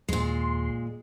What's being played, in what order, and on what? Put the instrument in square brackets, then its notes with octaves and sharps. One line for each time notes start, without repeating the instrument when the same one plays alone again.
[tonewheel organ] D#2 C6 [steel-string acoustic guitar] A#2 G#3